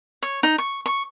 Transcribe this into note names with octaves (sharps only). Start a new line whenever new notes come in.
C#5
D#4
C#6
C#6